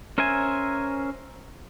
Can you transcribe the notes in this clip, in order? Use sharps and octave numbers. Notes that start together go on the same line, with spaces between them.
C#4 A#4 C5 E5 G#5